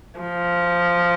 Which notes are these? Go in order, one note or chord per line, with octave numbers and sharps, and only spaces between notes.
F3